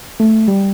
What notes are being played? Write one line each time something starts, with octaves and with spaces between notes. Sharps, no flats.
A3
G3